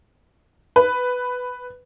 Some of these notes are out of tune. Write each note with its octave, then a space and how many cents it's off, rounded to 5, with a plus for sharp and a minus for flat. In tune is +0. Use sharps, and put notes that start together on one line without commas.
B4 +10